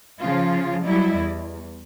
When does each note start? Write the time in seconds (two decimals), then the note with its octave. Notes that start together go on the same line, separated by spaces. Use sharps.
0.19 C#3 F3 F4
0.83 F#3 G3 E4 D5 D#5
1.16 E2